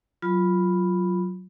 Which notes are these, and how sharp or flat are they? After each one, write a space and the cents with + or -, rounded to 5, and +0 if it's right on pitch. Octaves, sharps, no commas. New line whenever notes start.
F#3 +0 F4 +0 B5 +0